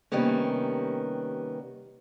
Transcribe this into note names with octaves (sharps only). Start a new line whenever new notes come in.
C3 D#3 G3 A#3 B3 C#4